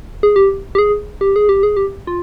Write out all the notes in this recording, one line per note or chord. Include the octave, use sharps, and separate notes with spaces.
G#4
G4
G4
G#4
G4
G#4
G4
G#4
G4
F4